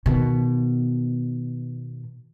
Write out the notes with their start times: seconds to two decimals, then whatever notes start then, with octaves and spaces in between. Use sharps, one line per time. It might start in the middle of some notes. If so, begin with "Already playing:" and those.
0.06 B2 D#3